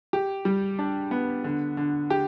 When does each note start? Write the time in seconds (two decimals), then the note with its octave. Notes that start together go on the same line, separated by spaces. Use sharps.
0.13 G4
0.45 G3
0.79 D4
1.11 B3
1.44 D3
1.77 D3
2.10 G4